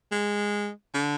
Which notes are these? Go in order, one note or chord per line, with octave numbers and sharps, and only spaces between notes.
G#3
D3